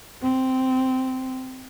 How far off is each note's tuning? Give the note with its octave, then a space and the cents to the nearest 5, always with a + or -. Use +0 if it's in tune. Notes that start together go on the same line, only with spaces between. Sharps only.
C4 -10